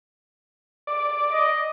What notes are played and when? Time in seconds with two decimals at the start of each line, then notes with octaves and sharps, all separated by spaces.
0.87 D5
1.31 D#5